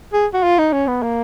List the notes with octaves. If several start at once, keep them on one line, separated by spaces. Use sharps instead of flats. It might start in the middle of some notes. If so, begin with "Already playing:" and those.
G#4
F#4
F4
D#4
C#4
B3
A#3